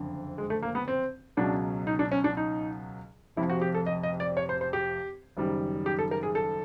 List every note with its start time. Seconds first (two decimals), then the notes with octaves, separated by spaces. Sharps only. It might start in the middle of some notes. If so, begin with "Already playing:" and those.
Already playing: F#1 F2 D3
0.38 G#3
0.50 A3
0.62 A#3
0.75 B3
0.88 C4
1.37 C#2 B2 F#3 D4
1.87 D#4
1.99 D4
2.12 C#4
2.24 D4
2.37 D#4
3.36 F1 F2 C3 F3 E4
3.49 F#4
3.61 G4
3.75 A4
3.86 D#5
4.03 D#5
4.20 D5
4.37 C#5
4.49 C5
4.61 C5
4.73 G4
5.37 F#1 F#2 D#3 G3
5.86 G4
5.99 A4
6.11 A#4
6.23 G#4
6.35 A4